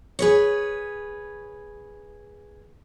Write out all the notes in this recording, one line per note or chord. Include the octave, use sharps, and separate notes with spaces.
G#4 B4 C#5